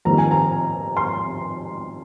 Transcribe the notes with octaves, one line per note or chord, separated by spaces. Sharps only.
F2 D#3 G3 A#3 A#5
G#5
A#5
C6